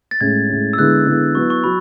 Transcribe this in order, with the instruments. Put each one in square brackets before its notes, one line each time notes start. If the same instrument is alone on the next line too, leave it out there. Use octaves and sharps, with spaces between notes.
[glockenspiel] A6
[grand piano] A2 G#3 C#4 [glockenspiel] G#6
[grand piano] A2 G#3 C#4
[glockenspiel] E6
[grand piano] D3 G#3 B3 E4 [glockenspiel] F#6
[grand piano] D3 G#3 B3 E4
[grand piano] F#3 B3 E4 [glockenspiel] C#6
[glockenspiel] C#6
[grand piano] F#3 [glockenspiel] B5